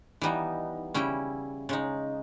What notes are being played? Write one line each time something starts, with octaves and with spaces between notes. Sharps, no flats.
E3 G3 B3 D#4
C#3 G3 C#4 E4 G4
C#3 G#3 D#4